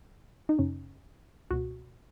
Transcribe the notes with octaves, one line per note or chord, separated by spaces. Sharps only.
D#4
F#2 C#3 C#4
C#2 B2 F#4